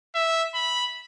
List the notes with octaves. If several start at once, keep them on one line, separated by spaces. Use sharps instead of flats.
E5
B5